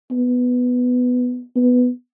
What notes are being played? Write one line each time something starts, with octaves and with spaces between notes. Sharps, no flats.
B3
B3